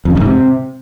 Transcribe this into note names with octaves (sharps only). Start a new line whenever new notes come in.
F2
C#3
F#2
G#2
C3